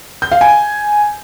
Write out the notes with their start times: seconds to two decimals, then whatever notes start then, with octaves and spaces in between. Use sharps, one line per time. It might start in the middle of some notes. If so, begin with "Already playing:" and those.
0.22 G6
0.32 F5
0.41 G#5